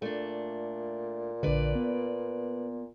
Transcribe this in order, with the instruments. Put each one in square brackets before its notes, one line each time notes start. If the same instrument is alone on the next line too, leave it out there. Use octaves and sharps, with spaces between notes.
[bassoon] A#2 [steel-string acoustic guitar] A3 D4
[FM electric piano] A#1 D3 [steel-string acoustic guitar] B4 D5
[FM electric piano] B3